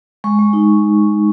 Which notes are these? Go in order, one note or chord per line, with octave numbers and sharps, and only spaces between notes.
G#3 C#6
G#3
D#4